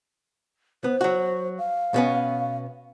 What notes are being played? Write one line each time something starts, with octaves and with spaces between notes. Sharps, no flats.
B3 C5
F#3 F#4
F5
B2 B3 C#4